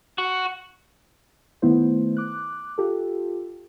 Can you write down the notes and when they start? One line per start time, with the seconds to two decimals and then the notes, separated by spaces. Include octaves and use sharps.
0.18 F#4
1.62 D#3 A3 B3 E4 C5
2.17 D6 F#6
2.78 F4 G4 A4